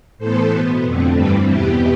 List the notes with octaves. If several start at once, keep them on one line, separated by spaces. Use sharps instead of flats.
A2 E3 B3 A4 C5
B2 B3
F2 D3 A3 C4
G2 E3 G3 C4 G4 B4
E2 B2 B3 E4 G4